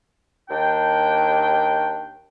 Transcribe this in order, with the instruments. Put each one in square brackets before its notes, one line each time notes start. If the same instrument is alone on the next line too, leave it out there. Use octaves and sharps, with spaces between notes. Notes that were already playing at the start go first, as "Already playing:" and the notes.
[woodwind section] D#2 D4 G5